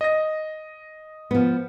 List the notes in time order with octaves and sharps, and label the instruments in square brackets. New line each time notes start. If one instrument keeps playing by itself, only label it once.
[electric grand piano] D#5 A#6
[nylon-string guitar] F3 B3